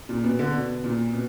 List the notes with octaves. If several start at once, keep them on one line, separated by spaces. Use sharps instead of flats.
A#2
B2
D3
B2
A#2
B2